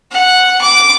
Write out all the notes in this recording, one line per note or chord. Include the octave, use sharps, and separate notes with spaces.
F#5
D6